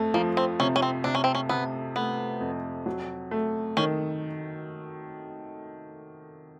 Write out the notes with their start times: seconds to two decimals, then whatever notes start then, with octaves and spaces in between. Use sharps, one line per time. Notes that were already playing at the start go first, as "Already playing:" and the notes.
Already playing: F2 A3
0.14 F3 A#3
0.37 C4
0.60 C3 C#4
0.76 C#4
0.82 C4
1.04 C3 D4
1.15 C#4
1.24 C4
1.35 C#4
1.49 C3 B3
1.95 A3 B3
2.41 F2
2.86 F#3
3.31 A3
3.77 D#3 C#4